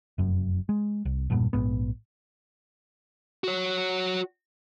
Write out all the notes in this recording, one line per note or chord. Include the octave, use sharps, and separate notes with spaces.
F1 F#2
G#3
C2
E1 G2 A#2 B3
A#1 G#2 B3
F#4 C#5